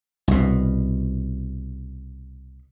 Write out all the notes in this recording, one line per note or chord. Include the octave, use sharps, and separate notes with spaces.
C2 B2